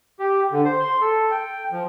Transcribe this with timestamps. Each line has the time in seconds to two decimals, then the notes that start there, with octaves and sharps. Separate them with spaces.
0.19 G4
0.52 D3
0.65 C5
0.80 C6
1.01 A4
1.31 G5
1.72 F3